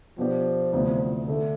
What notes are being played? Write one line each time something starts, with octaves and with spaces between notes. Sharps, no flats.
B2 F3 B3 D4 G4
D2 C3 E3 B3 D4
D3 A3 D4